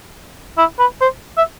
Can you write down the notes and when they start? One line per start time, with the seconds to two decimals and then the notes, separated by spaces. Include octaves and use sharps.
0.58 E4
0.79 B4
1.01 C5
1.38 E5